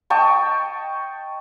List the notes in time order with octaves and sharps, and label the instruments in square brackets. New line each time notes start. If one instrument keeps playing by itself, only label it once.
[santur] D#5 G5 A5 C#6